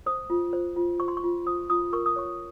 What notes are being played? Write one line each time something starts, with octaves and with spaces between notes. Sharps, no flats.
C5 D#6
F4
C5
F4
C5 C#6
C6
C#6
F4
C5 D#6
F4 D#6
A#4 C#6
D#6
C#5 C#6